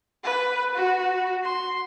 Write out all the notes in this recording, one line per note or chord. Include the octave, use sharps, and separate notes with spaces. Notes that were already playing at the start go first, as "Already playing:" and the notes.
B4
F#4
C6